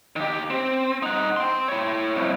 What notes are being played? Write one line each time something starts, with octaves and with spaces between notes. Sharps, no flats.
D#3 G4
C4
D#4 F#5
G5 C6
E4 C#5
C2 F2